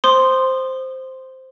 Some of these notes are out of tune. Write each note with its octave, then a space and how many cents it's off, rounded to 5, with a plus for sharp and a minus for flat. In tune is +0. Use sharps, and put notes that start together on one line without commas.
C5 +0 C6 +0 D#6 -30